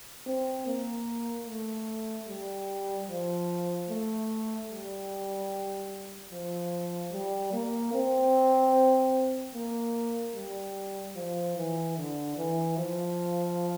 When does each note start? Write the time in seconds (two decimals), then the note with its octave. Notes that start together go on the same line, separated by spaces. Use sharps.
0.26 C4
0.67 A#3
1.47 A3
2.28 G3
3.08 F3
3.89 A3
4.70 G3
6.31 F3
7.12 G3
7.53 A#3
7.93 C4
9.55 A#3
10.36 G3
11.16 F3
11.57 E3
11.97 D3
12.37 E3
12.78 F3